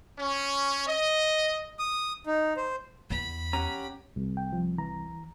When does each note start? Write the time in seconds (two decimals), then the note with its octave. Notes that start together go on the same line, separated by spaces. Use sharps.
0.18 C#4
0.88 D#5
1.79 D#6
2.27 D#4
2.57 C5
3.10 E2 B5
3.53 C#4 G4 F#5 A#5
4.16 C2
4.37 G5
4.53 F3
4.78 E3 A#5